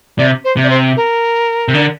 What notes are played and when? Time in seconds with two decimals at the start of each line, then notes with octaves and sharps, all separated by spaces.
0.18 C3 D5
0.45 C5
0.57 C3
0.64 D5
0.70 C5
0.97 A#4
1.68 C3
1.74 D3